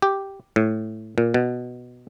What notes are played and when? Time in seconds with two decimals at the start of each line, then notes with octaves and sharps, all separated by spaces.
0.02 G4
0.56 A2
1.18 A#2
1.34 B2